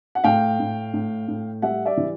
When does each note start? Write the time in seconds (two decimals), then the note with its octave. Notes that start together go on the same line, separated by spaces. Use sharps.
0.15 F#5
0.24 A2 F5 G5
0.59 A2
0.94 A2
1.28 A2
1.62 G3 E5 F#5
1.86 D5 E5
1.97 E3